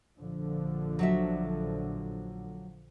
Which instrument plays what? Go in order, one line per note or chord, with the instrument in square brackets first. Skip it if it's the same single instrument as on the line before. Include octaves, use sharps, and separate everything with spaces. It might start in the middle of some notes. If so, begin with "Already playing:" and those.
[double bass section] A#1 D3 F3
[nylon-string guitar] F#3 F#4 E5